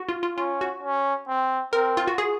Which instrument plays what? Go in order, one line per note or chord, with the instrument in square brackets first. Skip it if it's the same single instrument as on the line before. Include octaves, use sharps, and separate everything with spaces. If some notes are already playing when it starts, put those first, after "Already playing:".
Already playing: [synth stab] F#4
F4
F4
[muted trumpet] C#4 [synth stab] F4
[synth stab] F#4
[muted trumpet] C#4
C4
[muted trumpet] C4 [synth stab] A#4
[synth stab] F4
F#4
G#4